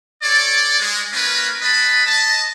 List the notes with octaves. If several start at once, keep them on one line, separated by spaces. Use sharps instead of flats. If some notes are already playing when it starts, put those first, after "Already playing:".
A4 C#5 D5
G#3
A#3 C#4 F4 A#4 B4
G#3 B4 D#5 A5 B5
D#5 A5